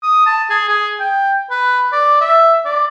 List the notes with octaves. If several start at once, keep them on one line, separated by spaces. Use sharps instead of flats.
D#6
A5
G#4
G#4
G5
B4
D5
E5
D5